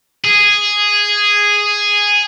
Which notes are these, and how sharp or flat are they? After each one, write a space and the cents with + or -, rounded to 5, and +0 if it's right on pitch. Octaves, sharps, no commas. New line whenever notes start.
G#4 -5